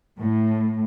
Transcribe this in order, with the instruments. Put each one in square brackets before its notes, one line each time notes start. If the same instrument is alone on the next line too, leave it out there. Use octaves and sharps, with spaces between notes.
[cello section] A2